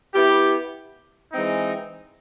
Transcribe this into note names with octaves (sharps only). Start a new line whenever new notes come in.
B3 E4 G4
E3 G#3 C4 D#4